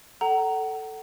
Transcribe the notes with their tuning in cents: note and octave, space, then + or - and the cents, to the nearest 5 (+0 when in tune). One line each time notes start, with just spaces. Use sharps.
A4 +0 F#5 +30 A#5 +0